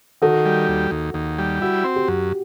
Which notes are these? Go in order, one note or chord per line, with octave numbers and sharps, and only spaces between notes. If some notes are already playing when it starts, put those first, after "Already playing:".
D#3 F#4 A4
G3
D#2
D#2
D#2
G3
E4 F#4
C4
G4
F#2